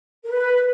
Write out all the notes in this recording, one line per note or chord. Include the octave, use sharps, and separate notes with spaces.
A#4
B4